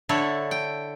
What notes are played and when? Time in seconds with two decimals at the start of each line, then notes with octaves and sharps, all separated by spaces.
0.09 D3 E4 A4 C#5
0.51 G5